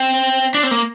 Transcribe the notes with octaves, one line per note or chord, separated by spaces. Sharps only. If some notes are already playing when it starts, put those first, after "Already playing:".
Already playing: C4
D4
C4
A#3